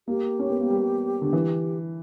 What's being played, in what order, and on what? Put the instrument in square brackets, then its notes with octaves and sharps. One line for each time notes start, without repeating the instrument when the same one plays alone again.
[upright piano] A#3 [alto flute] G4
[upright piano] C#4
B3
A#3
G3
D3
E3